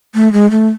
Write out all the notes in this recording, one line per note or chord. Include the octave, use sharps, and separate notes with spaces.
A3
G#3
A3